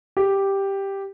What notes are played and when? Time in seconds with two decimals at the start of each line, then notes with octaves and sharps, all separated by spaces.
0.17 G4